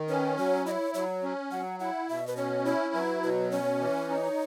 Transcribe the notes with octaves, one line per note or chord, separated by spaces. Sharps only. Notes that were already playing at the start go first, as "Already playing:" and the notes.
Already playing: D#3
C#4 B4
F#3 C#5
E4 D#5
C#5
F#3 C#5
C#4
F#3 F#5
E4 F#5
B2 E5
B4
C#4 C#5
E4 C#5
F#3 B4
B2 B4
C#4 C#5
E3
D#4